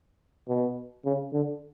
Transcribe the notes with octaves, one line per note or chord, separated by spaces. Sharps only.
B2
C#3
D3